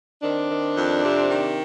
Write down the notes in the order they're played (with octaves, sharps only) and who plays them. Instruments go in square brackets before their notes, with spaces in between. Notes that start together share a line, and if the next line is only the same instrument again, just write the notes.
[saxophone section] D#3 C4 D4
D#3
F2
C3
D#3